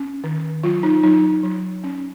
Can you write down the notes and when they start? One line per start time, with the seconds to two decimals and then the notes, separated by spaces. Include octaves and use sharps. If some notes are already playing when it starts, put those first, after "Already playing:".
Already playing: C#4
0.24 D#3
0.64 F#3 F4
0.83 D#4
1.03 F#3 D#4
1.43 F#3
1.84 C#4